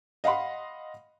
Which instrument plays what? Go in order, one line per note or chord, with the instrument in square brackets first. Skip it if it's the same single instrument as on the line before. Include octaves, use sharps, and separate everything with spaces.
[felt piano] D#5 F5 F#5 B5 C6